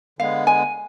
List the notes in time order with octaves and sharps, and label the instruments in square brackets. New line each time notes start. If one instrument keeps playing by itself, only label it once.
[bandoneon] D3 G#3 B3 [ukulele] F5
[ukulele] G#5